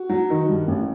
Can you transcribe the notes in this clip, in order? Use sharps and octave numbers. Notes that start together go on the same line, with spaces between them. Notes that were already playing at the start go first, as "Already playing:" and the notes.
Already playing: F#4
F#3
D#3
G2
A1